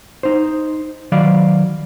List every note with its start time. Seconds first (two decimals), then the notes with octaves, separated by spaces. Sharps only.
0.23 D#4 C5
1.12 D#3 F#3 D5 F5 B5